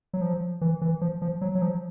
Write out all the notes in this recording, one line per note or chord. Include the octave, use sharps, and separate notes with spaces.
F#3
F3
E3
E3
F3
F3
F#3
F#3
F3